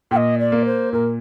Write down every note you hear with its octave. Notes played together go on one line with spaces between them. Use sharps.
A#2 G5
D#5
D5
A#3
C5
A#2 A#4